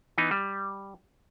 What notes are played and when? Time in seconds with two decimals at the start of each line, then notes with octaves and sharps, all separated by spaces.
0.18 E3 B3 D#4
0.31 G3